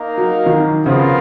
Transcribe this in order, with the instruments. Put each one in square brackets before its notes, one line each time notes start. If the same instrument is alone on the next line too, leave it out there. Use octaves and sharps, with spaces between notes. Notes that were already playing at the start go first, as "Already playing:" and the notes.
Already playing: [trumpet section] A#3 D#4 A#4 F5
[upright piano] F#3
D#3 F#3
[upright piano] C#3 F3 [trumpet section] B3 F4 A#4